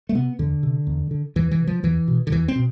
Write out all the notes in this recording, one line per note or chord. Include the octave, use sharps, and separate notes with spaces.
A3
C3 B3
E2 D3
C3
E2
D3
E2 E3
E3
C3
F3
E2 E3
B2
D3
E2 E3
C4
B2